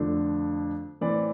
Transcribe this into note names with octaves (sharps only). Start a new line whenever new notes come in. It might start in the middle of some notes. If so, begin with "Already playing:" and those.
Already playing: F2 D3 F3 A3 D4
A2 E3 A3 C4 D5